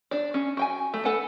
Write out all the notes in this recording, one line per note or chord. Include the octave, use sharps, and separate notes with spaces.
D4 D5
C#4
F#4 G5 G#5
A3
A4 B4 F#5 G#5